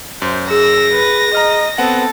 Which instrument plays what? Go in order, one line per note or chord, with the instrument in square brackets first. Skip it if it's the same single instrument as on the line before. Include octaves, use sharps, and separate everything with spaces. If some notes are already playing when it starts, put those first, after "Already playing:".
[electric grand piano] F#2 [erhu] C5
[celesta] G#4 [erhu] E6 [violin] A#6
[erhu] B4
[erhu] D#5 [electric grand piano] A#5 F6
[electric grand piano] B3 C4 F#5 [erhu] A4